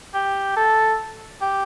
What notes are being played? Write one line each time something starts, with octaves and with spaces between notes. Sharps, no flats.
G4
A4
G4